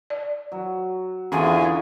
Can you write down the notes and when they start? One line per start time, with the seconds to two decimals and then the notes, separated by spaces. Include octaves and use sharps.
0.10 D5
0.52 F#3
1.32 E2 D3 C#4 F4 G#4